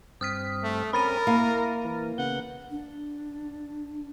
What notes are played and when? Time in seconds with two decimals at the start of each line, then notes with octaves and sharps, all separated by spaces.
0.21 G2 C4 D#6 F6 B6
0.63 A3
0.93 C4 C#4 A#4 B5 A6 D#7
1.27 A#3 E4
1.85 E3 A#4
2.18 C#3 B3 F#5 G6
2.71 D4